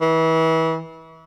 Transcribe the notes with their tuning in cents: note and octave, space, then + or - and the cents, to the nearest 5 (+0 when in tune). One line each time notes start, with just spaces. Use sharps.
E3 -30